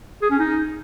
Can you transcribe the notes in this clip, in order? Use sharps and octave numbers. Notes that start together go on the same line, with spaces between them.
G#4
C#4
D#4